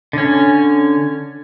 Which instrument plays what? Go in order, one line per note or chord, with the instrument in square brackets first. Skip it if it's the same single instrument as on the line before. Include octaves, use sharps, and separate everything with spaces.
[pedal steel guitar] D3 C#4